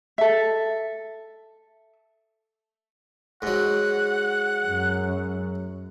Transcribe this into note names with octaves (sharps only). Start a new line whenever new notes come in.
A4 E5
G#2 F#3 F#5
F#2